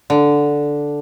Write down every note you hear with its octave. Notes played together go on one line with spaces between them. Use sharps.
D3